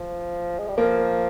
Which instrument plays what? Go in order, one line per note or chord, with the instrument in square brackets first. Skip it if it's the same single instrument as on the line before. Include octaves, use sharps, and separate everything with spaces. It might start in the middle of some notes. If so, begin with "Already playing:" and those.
Already playing: [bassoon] F3
G#3
G3
[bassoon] F3 [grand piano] A#3